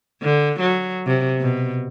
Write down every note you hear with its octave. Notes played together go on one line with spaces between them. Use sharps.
D3
F#3
C3
B2